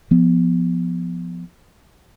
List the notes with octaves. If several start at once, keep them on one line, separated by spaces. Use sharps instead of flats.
F3 B3